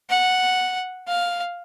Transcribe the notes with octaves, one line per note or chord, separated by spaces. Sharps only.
F#5
F5